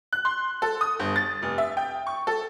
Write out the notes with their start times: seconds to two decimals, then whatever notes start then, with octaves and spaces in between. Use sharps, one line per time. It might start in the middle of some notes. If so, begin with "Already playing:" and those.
0.13 F#6
0.25 C6
0.62 A4
0.81 D#6
0.99 G1
1.16 A6
1.42 F1
1.58 E5
1.77 G5
2.07 C#6
2.27 A4